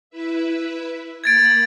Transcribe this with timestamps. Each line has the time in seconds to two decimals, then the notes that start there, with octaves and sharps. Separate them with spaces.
0.10 E4 B4 E5
1.24 A#3 B5 G#6 A6 D7